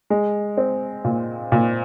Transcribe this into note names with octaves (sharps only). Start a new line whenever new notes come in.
G#3
C4
A#2
A#2